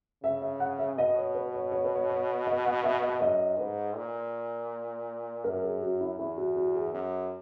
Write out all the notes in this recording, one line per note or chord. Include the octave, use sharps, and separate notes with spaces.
C#3 E5
E5
F#5
E5
B2 D#5
C#5
B4
C#5
C#5
B4
C#5
C#5
D#5
F#5
E5
D#5
F#2 D#5
G#2 B4
A#2
F#2 A#4
G#4
F#4
E4
E2 E4
F#4
F#4
G#4
F#2